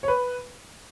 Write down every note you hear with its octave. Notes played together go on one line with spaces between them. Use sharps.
C#5
B4